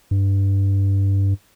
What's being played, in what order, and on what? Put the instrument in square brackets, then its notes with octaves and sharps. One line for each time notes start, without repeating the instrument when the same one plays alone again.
[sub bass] G2